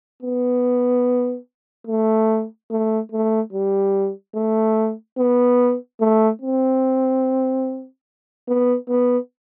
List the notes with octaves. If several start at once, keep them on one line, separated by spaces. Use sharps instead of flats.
B3
A3
A3
A3
G3
A3
B3
A3
C4
B3
B3